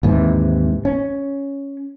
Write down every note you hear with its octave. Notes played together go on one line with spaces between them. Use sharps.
D#2 G#2 C3 E3
C#4